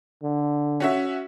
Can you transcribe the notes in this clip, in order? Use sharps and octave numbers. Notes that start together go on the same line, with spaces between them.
D3
C#4 F#4 E5